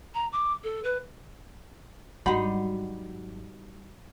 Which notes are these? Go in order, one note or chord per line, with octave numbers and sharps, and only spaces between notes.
A#5
D6
A4
B4
G#1 F#3 G3 D#4 F#4 F#5 B5